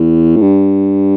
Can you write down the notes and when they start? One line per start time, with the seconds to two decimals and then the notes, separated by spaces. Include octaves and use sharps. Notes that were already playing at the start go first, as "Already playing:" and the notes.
Already playing: E2
0.36 A2
0.41 G2